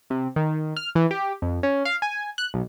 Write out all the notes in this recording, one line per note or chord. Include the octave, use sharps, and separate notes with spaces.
C3
D#3
F6
E3
G4
F2
C#4
F5
G#5
F#6
B1